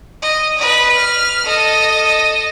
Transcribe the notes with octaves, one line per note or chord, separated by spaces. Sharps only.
D#5
B4 D#5
F6
A4 D#5